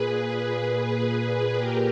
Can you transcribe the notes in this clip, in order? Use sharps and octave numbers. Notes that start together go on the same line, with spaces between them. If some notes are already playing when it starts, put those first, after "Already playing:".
Already playing: A#2 G#4 B4
A#2 G4 A#4